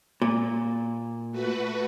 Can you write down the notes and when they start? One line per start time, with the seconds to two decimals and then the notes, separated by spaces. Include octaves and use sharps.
0.22 A#2
1.32 A3 F#4 B4